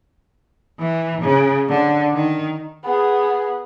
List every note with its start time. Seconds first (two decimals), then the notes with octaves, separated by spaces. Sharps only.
0.79 E3
1.21 C#3
1.68 D3
2.14 D#3
2.84 B3 G#4